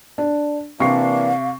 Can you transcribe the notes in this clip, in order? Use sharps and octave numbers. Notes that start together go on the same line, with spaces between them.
D4
C3 E3 A#3 D4 F5 C#6 C7